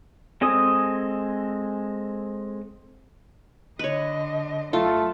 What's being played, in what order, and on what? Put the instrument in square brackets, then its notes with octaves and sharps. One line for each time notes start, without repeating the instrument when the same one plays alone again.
[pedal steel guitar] G#3 C4 A4 G#5 D#6
[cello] D3 D#5 [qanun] B4 C#5
[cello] F#2 A4 [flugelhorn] A3 [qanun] F4